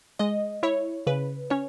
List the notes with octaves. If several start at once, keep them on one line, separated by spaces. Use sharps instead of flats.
G#3 D#5
E4 C#5
C#3 B4
C#4 C#5